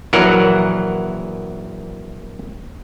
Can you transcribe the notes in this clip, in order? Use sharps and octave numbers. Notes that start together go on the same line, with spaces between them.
A#1 E3 F#3 A#4 F#5